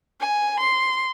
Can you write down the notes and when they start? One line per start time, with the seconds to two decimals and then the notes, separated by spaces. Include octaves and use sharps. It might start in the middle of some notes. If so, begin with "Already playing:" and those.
0.21 G#5
0.60 C6